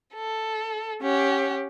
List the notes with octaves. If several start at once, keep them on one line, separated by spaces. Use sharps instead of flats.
A4
C#4 G4 F#5